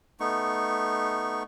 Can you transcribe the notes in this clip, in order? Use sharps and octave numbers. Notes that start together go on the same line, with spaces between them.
A3 B3 D#4 C#6